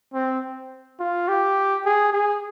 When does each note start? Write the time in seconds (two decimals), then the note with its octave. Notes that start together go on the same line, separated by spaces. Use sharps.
0.14 C4
1.00 F4
1.28 G4
1.86 G#4
2.13 G#4